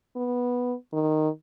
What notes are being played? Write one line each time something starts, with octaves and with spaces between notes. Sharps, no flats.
B3
D#3